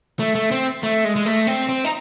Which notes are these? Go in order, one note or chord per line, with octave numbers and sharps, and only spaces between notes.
A3
A3
C4
A3
G#3
G#3
A3
C4
C4
D#4